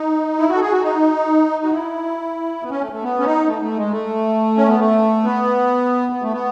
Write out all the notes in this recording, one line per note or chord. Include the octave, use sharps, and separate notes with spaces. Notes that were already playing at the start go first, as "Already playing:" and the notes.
Already playing: D#4
E4
F#4
A4
G#4
F#4
D#4
F#4
E4
B3
C#4
A3
A3
B3
C#4
D#4
A3
A3
G#3
A3
C#4
B3
A3
B3
B3
A3
B3